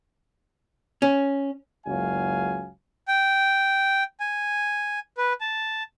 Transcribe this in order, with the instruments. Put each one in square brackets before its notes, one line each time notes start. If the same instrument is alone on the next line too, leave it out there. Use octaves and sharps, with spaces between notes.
[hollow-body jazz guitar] C#4
[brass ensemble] F#1 C#2 F#3 F5 G#5
[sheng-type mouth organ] G5
G#5
B4
A5